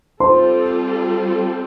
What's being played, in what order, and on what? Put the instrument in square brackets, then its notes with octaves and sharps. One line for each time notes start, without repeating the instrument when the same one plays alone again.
[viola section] G3 C4 F4 A4 [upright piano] C5 C6